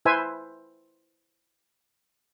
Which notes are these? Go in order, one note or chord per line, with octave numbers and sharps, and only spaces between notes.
E4 B4 C5 E5 G#5